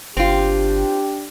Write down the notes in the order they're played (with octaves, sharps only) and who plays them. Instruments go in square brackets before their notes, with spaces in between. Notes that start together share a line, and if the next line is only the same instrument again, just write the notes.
[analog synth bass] G1 [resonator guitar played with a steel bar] C4 F4 [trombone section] D4 G4